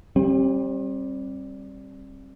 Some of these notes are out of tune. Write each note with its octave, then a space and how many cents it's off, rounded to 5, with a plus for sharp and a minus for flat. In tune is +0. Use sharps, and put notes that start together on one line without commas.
G3 +0 C4 +40